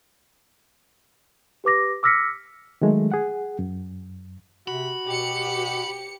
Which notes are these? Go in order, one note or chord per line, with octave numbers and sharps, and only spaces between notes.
G4 B4 D6 A#6
D6 E6 F6 A#6 B6 C#7
D#3 F#3 G#3 A3
G#4 F#5
F#2
C3 F#4 B5
B2 G4 C#7